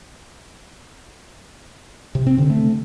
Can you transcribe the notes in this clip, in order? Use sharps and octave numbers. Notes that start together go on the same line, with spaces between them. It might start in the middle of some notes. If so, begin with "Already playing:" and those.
C3
C4
D3
A3